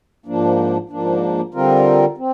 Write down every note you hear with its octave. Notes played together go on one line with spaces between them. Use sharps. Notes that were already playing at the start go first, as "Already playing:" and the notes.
G#2 F3 A#3 D4
G#2 F3 A#3 D4
D3 G3 C4 F4 A#4
C4